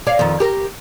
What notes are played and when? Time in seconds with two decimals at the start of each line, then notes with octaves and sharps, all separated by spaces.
0.07 C#5 D5 F5
0.19 F2 D#3
0.40 G4 A#4